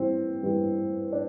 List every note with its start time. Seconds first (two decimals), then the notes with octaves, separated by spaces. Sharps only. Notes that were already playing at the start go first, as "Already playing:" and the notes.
Already playing: G2 E3 G3 C4
0.43 G2 E3 G3
1.12 D4